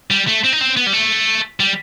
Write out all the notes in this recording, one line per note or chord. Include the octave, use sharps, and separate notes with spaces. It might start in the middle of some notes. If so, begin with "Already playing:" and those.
G3
A3
C4
D#4
C4
B3
G3
A3
G3